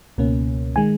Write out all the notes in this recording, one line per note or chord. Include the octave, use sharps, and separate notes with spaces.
C#2 B2 A#3 C#4
D#3 G#3 G#5